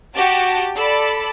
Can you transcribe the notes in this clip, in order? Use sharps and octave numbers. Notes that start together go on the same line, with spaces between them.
F#4 G4 A5
A4 D5 B5